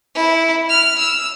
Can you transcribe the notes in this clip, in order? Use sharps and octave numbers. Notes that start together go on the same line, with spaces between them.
E4
F6
E6